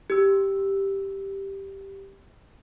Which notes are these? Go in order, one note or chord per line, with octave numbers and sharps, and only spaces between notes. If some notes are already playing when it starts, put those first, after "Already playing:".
G4 E6